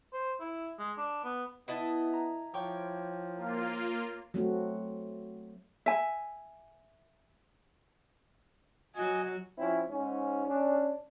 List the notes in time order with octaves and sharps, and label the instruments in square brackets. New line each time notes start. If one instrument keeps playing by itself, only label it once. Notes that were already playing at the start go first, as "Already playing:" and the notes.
[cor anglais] C5
E4
G#3
D4
B3
[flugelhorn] B3 [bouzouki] E4 D#5 A5
[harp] A#5
[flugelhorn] F3 [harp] C#5 G5 D6
[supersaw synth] A#3 F4
[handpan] F#3 A3 C4 F#4
[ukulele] E5 G#5
[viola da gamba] F#3 F#4 [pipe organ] D#5 G#5
[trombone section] F3 C4 C#4 E4
G#2 C#4
C#4 D4